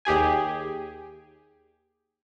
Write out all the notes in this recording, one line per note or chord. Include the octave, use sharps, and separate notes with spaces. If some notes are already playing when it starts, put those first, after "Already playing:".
D#2 G4 G#4 G#5